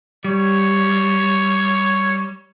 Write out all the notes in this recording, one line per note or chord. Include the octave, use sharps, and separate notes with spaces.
G3 C#5